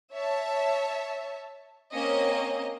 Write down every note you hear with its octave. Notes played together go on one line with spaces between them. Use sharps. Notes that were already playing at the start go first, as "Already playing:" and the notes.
C#5 E5 A5
A#3 C4 C#4 D#5